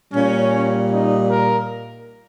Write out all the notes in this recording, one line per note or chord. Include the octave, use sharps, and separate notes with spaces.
A#2 G3 C#4
D#4
A#4